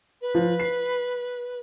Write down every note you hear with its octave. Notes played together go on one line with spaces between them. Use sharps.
B4
F3
C7